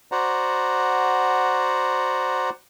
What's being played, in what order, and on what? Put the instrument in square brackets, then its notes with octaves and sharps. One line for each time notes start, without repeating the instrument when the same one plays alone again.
[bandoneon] F#4 C5 D5 F#5 A#5